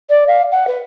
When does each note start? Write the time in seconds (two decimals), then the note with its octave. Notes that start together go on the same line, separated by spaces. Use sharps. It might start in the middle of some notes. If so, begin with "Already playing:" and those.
0.10 D5
0.27 F5
0.52 F#5
0.67 B4